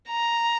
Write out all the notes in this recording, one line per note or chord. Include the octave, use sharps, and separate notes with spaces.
A#5